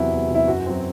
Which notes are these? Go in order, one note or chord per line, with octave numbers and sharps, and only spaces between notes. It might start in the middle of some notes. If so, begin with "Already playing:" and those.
Already playing: E2 C3 F#3 E4
E2
C3 F#3
E4
F#2 F#4
F#3 C4